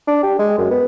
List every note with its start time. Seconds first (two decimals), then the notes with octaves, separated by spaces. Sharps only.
0.08 D4
0.23 G4
0.39 G#3
0.58 F#2
0.71 B3